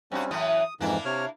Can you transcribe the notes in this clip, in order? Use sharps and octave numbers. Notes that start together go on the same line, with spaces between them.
G2 G3 C4 C#4 F#4
F#2 A2 E3 D#6
F2 G#2 E3 A#3 D4 E4
C3 C#5 F6